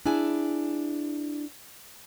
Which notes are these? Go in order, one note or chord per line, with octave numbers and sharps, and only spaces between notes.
D4 E4 G#4 G#5